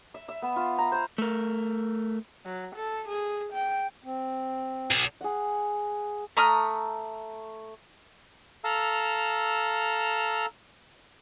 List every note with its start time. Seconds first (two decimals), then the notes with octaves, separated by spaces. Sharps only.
0.14 E5
0.28 E5
0.42 B3
0.56 F4
0.78 A#5
0.92 C5
1.18 A3 A#4
2.45 F#3
2.75 A4
3.08 G#4
3.53 G5
4.04 C4
4.91 B1
5.21 G#4 F#5
6.37 A3 A#5 D#6 F6
8.64 A4 F5 A#5 E6